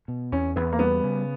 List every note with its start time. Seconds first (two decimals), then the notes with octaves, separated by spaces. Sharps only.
0.08 B2
0.32 E2 C#4
0.56 E2 B3
0.73 A#3
0.79 G3 B3
1.03 C#3